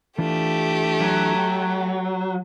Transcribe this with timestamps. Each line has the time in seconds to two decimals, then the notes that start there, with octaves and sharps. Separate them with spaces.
0.18 E3 A3 D4 F4 G4
1.01 F#3
1.39 G5